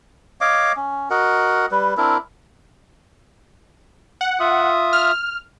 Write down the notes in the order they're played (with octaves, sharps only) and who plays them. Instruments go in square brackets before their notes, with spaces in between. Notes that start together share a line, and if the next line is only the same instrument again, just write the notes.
[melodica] C#5 D#5 F5 D6
C#4
F#4 A#4 D#5 F#5
G3 B4
C4 D4 E4 A#4
[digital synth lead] F#5
[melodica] F4 E5 D#6
[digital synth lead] F6